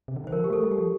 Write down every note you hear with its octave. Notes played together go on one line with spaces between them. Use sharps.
C3
D3
D#3 C5
F3 A#4
G4
A3 A4
G3
G4
F3